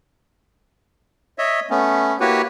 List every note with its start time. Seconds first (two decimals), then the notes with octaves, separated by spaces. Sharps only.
1.38 C#5 D#5 E5
1.70 A3 B3 C#4
2.20 A#3 E4 F#4 G4 B4 C#5